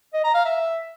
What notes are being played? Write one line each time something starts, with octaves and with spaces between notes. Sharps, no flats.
D#5
A#5
F5
E5